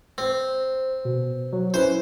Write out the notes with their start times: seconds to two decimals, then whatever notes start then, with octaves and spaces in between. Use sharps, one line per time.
0.18 C4 C5
1.05 B2
1.53 F#3
1.74 C#4 E4 B4 C5